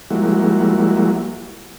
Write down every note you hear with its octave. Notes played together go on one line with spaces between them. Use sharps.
F3 G3 G#3 A#3 E4 F#4